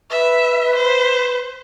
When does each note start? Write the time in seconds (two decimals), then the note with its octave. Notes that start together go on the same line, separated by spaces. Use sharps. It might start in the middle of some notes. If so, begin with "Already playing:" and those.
0.11 B4 E5
0.76 C5